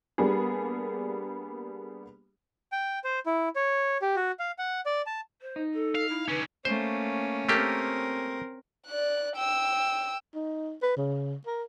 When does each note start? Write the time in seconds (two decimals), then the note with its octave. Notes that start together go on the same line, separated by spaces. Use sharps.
0.18 G3 A#3 B3 D4 G#4
2.72 G5
3.04 C5
3.26 E4
3.56 C#5
4.02 G4
4.16 F#4
4.39 F5
4.59 F#5
4.86 D5
5.06 A5
5.41 C5
5.56 D#4
5.73 A4
5.95 F5
6.09 E4
6.28 D3 C#4 B4
6.65 A3 A#3 C#4 C5
7.49 A3 A#3 C4 G4 A#4
8.86 D5 F#6
9.36 G5 E6
10.35 D#4
10.83 B4
10.97 C#3
11.47 A#4